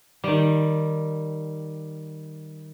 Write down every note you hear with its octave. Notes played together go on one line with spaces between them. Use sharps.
D#3 G3